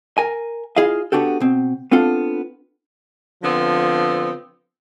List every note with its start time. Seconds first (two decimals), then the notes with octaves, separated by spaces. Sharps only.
0.18 A#4 G#5
0.76 E4 F4 G#4 D#5 F5
1.12 B3 D4 F#4 G4 A4
1.40 B2 C4
1.92 B3 C4 D4 F4 A4
3.43 D3 F3 B3 C4